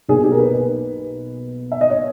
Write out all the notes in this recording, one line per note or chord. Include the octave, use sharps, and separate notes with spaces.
B1 B2 A#3 G#4
G4
A#4
B4
B4
E5
D#5
C#5